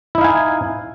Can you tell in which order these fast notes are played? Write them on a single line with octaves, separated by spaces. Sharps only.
E4 D#4 F5 G#5